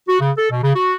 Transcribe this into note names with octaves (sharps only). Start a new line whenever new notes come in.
F#4
C#3
A4
B2
C#3
F#4